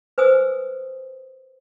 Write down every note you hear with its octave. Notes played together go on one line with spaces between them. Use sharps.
B4 C5 G#5 D#6 E6